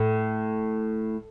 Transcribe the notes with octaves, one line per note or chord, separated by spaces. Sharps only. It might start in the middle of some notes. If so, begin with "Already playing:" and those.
Already playing: A2